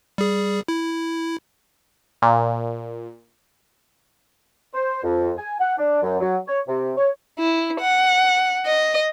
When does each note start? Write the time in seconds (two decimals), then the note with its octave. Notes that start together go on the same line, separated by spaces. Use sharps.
0.18 G3 G#4
0.68 E4
2.22 A#2
4.74 C5
5.03 F2
5.38 G#5
5.60 F#5
5.78 D4
6.03 F#2
6.20 F#3
6.48 C#5
6.68 C3
6.98 C#5
7.39 E4
7.81 F#5
8.66 D#5